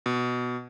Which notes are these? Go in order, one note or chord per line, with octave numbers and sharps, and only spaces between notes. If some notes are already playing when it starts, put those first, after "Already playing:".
B2